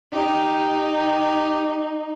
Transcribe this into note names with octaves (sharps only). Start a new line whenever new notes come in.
D#4 G4